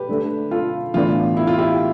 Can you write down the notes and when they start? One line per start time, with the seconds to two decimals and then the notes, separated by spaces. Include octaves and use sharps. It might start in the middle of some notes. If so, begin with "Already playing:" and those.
Already playing: G4 B4
0.09 D3 A3 D4
0.51 F4 A4
0.94 A2 E3 B3 D4 F4
1.37 E4
1.47 F4
1.58 E4 G4